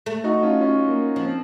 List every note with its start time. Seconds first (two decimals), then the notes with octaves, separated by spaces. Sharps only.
0.06 A3
0.24 D#4 F#4
0.42 C#4 F4
0.60 C#4 F4
0.88 A#3
1.16 F3
1.24 C4